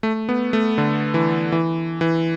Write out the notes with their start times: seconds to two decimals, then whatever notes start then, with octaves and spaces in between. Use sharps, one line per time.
0.03 A3
0.29 B3
0.53 A3
0.78 D3
1.14 E3
1.52 E3
2.01 E3